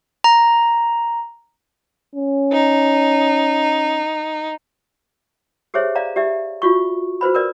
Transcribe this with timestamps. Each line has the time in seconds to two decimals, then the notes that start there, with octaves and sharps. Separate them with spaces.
0.24 A#5
2.15 C#4
2.53 D#4
5.74 G4 G#4 C5 C#5 E5
5.95 D5 F5 A#5
6.16 G4 D5 E5
6.62 F4 F#4 C#6
7.21 F#4 B4 C5 B5
7.34 A#4 B4 D5